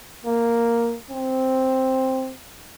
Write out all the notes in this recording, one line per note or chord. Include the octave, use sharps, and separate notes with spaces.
A#3
C4